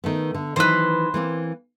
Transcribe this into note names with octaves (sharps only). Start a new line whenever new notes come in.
D#3 A3 B3
D3
D#3 E3 F#3 B4 C5
E3 A#3 C4